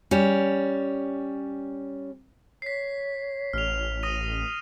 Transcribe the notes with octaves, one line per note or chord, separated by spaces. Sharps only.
G3 C#4
C#5 B6 C7
A1 F6 F7
D#6 A#6 D#7